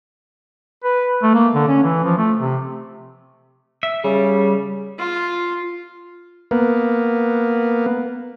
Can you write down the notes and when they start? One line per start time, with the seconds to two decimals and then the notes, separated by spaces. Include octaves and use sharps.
0.84 B4
1.22 A3
1.34 A#3
1.55 D3
1.68 C#4
1.83 E3
2.04 F3
2.18 A3
2.39 C3
3.83 E5
4.04 C#3 G3
4.98 F4
6.51 A#3 B3